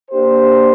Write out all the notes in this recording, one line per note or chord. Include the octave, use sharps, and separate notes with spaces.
A#3 D4 G4 C5